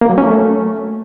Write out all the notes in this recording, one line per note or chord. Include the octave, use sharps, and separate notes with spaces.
A#3
F#3
C#4
A3